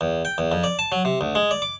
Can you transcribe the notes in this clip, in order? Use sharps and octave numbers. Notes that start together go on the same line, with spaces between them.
E2
G5
E2
F2
D5
A5
F#3
C3
D2
G#3
D5
D6